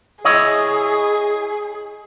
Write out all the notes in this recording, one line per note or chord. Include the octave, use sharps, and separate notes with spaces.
E4 G#4 C#5 D#5